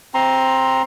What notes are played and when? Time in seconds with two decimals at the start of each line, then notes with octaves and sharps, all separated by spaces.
0.14 C4 A#5 C6